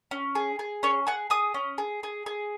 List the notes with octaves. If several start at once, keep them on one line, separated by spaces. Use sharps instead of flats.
C#4
G#4
G#4
C#4 C#5
G#4 F#5
G#4 D#6
C#4
G#4
G#4
G#4